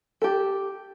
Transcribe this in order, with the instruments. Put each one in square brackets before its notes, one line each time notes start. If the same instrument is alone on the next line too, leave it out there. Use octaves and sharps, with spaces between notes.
[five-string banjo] G4 A4